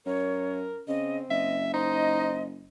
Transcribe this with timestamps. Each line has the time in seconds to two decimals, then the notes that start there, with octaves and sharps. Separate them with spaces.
0.06 F#2 A#4 C#5
0.88 C#3 C4 D#5
1.30 F#1 D#5 E5
1.74 D#4 C5 D#5